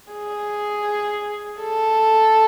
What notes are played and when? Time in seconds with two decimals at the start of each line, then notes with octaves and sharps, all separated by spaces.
0.12 G#4
1.60 A4